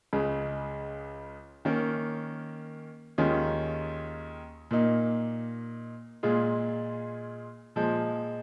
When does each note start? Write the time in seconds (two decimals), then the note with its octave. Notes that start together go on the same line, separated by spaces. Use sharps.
0.13 C#2 C#3 G#3
1.65 D#3 A#3 C#4 A#4
3.18 D#2 D#3 G#3 C#4 F4
4.71 A#2 A#3 D#4
6.23 A#2 G#3 F4 G#4
7.76 A#2 F3 G#3